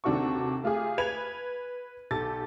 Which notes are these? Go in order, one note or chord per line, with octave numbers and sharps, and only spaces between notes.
D#2 C3 D4 F#4 A4 C#6
A3 F4 G4 G#4
B4 G#6 F7
B1 G4 A4 A6